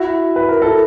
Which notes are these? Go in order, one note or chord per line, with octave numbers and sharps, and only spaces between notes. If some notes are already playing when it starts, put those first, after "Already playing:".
Already playing: E4 F#4
B4
A#4
A4